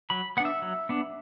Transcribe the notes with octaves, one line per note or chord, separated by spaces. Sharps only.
F#3 B5
B3 D4 F#5
E5
F#3
B3 D4